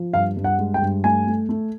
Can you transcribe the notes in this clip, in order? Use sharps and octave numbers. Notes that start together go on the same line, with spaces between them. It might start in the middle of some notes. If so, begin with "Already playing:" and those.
Already playing: F3
G2 F5
G2
F#5
G#3
G5
G2
A3 G#5
A3
A3